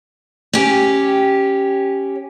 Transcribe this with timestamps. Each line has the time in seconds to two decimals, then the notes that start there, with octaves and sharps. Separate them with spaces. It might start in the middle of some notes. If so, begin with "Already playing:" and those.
0.53 C#4 G4